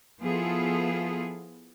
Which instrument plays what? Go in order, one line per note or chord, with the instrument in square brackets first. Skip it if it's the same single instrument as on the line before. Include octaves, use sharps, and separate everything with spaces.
[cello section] F3 B3 E4 F4 G#4 A4